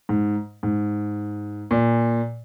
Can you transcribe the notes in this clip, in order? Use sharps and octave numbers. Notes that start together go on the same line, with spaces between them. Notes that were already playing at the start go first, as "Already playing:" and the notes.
G#2
G#2
A#2